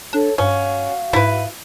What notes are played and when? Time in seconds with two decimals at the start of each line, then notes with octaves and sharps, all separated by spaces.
0.13 D4 A4 C#5 A5
0.38 G2 C#4 F#4 F5
1.13 G#2 E4 B4